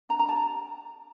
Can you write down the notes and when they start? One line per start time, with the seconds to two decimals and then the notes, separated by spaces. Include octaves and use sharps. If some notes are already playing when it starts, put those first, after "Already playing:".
0.09 D4 A#5
0.19 A#5
0.28 G4 A5